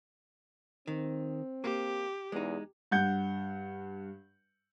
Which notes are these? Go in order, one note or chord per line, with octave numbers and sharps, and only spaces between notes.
D#3 C4
A#3 G4
E2 G#3 D#4
G2 F#5 G6